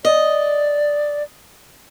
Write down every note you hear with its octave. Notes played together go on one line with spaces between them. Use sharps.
D5 D#5